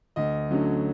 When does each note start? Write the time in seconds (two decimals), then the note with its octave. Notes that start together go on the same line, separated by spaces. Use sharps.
0.16 D2 D#5
0.51 D3 F#3 A3 C#4